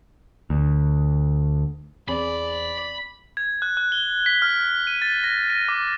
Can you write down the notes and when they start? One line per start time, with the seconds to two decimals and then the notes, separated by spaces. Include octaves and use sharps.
0.50 D2
2.08 E2 C4 G#4 D5 B5
3.37 G#6
3.62 F#6
3.77 F#6
3.92 G7
4.26 B6
4.42 F6
4.87 D#7
5.02 A6
5.24 A#6
5.50 D#7
5.68 D6